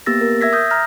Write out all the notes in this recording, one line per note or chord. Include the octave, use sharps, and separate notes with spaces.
A#3 B3 G4 E6 A6 A#6
A#4
E5 E6 G#6 A#6 B6
D#6 G6
A#5 F6 A#6